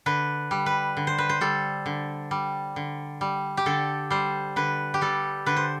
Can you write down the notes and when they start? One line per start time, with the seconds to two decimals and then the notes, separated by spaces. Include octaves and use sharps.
0.06 D3 B4
0.51 G3
0.66 B4
0.97 D3
1.07 C5
1.18 B4
1.29 C5
1.41 G3 A4
1.86 D3
2.31 G3
2.76 D3
3.21 G3
3.57 G4
3.66 D3 A4
4.10 G3 C5
4.56 D3 B4
4.94 G4
5.01 G3 A4
5.46 D3 B4
5.56 C5